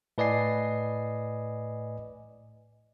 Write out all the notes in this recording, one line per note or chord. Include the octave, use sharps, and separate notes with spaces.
A2 B4 D5 D#5 G#5 C7